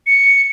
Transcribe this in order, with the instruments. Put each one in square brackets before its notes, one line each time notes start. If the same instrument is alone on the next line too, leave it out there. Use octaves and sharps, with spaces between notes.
[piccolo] C#7